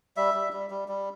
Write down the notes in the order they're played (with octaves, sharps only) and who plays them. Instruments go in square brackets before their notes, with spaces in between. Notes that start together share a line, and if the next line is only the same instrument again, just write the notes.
[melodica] G3 E5
G3
G3
G3
G3